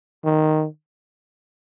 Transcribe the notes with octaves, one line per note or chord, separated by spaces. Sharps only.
D#3